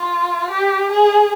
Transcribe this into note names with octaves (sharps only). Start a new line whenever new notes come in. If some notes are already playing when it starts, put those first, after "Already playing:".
Already playing: F4
G4
G#4